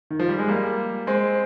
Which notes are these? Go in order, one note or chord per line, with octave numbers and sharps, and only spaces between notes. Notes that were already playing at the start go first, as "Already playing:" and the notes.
D#3
F3
G3
G#3
G3 A#3
G#3 C4